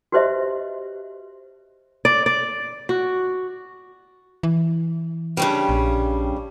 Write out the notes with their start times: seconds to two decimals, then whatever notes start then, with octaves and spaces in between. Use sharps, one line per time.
0.12 F#4 G4 B4 C5 D#5 E5
2.05 D5
2.26 D5
2.89 F#4
4.43 E3
5.37 G2 C#3 G3
5.69 A#1